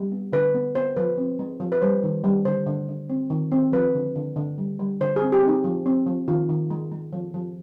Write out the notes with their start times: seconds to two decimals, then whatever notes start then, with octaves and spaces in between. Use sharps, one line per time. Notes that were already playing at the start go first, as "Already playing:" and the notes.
Already playing: G3
0.12 B3
0.33 D3 B4
0.54 B3
0.75 B3 C5
0.97 F3 B4
1.18 C4
1.39 G#3
1.60 F3
1.72 B4
1.82 G3 C5
2.03 D#3
2.24 G3
2.45 D3 C5
2.67 D3
2.88 D3
3.10 C4
3.30 D#3
3.52 C4
3.72 F3 B4
3.95 D3
4.16 D3
4.36 D3
4.58 G3
4.80 G3
5.01 D3 C5
5.16 G#4
5.22 C4
5.32 G4
5.43 C4 D#4
5.64 F3
5.86 C4
6.07 F3
6.28 D#3 F4
6.49 D#3
6.70 G#3
6.92 G#3
7.13 F3
7.34 F3